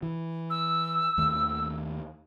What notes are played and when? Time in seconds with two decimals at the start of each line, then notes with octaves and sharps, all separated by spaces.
0.03 E3
0.50 E6
1.18 D#2 D#3 A3